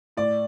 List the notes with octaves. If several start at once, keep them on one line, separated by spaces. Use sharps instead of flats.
A2 D5